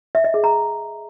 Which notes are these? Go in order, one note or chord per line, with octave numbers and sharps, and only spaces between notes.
E5
D#5
G#4
A#5